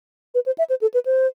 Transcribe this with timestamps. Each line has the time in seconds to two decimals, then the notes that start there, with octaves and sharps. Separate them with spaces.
0.35 B4
0.46 C5
0.58 E5
0.70 C5
0.81 A4
0.94 B4
1.06 C5